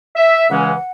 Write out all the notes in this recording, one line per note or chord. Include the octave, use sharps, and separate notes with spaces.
E5
C#2 C#3 E3 G#3 C#4 F#5